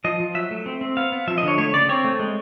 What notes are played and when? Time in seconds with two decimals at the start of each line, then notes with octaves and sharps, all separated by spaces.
0.04 F3 D#5
0.20 F3
0.34 F#3 E5
0.51 A3
0.66 C4
0.81 C4
0.97 B3 F5
1.12 B3
1.27 F3 E5
1.38 D#5
1.43 D3 C#5
1.58 A3 C#5
1.73 C#3 D5
1.89 C4 C#5
2.04 A3
2.19 G#3